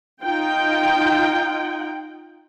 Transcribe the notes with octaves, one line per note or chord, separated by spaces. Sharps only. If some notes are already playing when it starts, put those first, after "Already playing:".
D#4 F4 G5